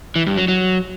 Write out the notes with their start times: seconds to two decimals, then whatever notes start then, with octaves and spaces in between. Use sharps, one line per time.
0.16 E3
0.26 G2
0.37 F#3
0.48 F#3